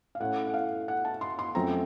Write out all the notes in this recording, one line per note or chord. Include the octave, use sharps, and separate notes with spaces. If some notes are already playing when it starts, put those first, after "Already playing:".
F5
A2 A3 C#4 F#5
F#5
F5
F#5
A5
C6
C6
F#2 F3 A3 C4 A#5